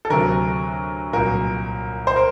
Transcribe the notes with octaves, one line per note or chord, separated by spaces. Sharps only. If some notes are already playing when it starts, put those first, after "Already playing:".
A4
D2 C3 F#3 A#4
C2 A#2 F#3 A#4
C5
A#4